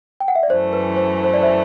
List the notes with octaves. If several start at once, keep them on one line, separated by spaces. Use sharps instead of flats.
G5
F#5
E5
D5
F#2 E3 A3 C5
B4
C5
C5
D5
C5 E5